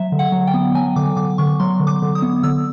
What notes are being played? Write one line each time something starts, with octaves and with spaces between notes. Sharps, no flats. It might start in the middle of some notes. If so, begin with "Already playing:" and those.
Already playing: F#3 E5
D3
F#5
F#3
G5
B3
F#3 G#5
D3 D6
D3 D6
D3 C#6
F#3 C6
D3
D6
D3
D#6
B3
D3 E6